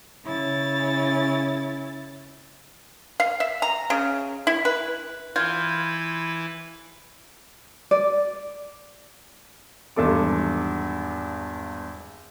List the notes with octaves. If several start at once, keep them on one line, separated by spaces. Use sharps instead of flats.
C#3 E4 C#5 A6
F5
E5
A#5
C#3
E4
B4
E3 F4 B4 G6 G#6
D5
G#1 E2 G2 A4 D6